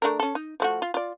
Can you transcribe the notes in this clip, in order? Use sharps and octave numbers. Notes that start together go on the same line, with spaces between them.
A3 D4 A#4
C#4 A4
D#4
F3 A3 F#4
F4
F4 D5